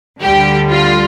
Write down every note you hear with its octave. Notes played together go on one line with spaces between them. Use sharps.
D2 D3 G3 G4
F4